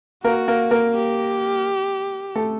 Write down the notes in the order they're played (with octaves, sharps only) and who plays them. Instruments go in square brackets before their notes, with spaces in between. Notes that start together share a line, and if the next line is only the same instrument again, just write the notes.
[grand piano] A#3 A#4 [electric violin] F#4
[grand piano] A#3 A#4
A#3 A#4
[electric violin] G4
[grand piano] A3 A4